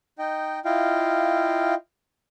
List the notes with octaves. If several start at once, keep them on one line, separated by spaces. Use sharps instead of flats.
D#4 D#5 G5
E4 F4 D#5 F5 G5